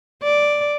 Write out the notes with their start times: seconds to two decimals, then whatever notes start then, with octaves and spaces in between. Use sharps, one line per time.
0.23 D5